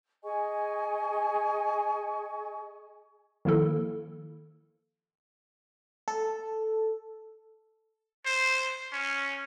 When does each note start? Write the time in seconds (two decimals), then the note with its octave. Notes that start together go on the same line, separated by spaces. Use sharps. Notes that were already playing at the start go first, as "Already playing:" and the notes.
0.24 G#4 D#5 G#5 C#6
3.45 D#3 F3 A#3 E4 A4
6.08 A4
8.25 C5
8.93 C#4